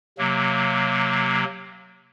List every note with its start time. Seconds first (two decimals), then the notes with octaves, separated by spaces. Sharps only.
0.18 C3 F#3 A#3